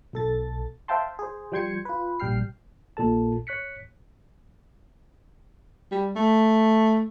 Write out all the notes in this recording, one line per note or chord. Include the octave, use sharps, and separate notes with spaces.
B1 A4 A6
C5 E5 F5 G5 A5 C6
G#4 C5
F3 G3 G5 C6 G#6 C#7
F4 B4
A#1 G3 G5 F6 C7
A#1 A#2 A4 A5
C#5 F#6 B6 C#7
G3
A3